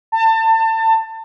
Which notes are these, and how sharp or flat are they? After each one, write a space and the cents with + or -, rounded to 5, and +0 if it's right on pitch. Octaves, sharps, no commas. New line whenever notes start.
A5 +30